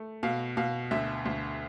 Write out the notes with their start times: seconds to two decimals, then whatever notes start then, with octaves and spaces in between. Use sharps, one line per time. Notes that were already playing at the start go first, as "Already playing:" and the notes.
Already playing: A3
0.23 B2 F5
0.57 B2 F5
0.91 D2 E5
1.25 D2